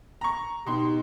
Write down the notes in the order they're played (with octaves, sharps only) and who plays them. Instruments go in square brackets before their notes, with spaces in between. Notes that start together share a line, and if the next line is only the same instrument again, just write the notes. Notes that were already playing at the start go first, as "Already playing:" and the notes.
[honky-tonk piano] A#5 C#6
[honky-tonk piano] B2 C6 [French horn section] D#4 G4